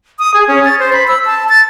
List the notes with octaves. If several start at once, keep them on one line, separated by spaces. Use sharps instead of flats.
D#6
G#4
C#4
A6
C5
B5
E6
A5
A6